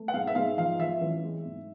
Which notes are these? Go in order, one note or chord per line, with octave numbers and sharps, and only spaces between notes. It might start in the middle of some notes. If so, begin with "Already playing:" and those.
Already playing: A3
F#5
G#2 F5
E5
G#2 F5
F3 F5
F3 E5
A1
G#3
G#2